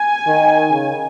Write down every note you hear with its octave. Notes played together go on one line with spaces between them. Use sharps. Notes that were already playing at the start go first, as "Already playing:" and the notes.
Already playing: G#5
D#3
C#3